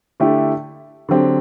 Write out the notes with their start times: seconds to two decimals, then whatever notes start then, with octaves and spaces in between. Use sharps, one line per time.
0.20 D3 A3 E4 G4
1.09 D3 F#3 C4 G4